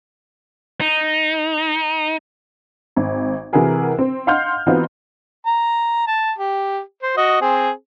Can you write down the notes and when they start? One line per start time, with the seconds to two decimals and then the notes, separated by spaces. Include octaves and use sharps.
0.81 D#4
2.96 G#1
3.53 C3 E3 E4 F#4 G#4 A#4
3.99 C4
4.27 D#5 F5 F#5 C6 F6 G6
4.66 E3 B3 C4 D#4 F4 F#4
5.46 A#5
6.07 A5
6.38 G4
7.02 C5
7.17 F#4 D#5
7.41 C4 G#4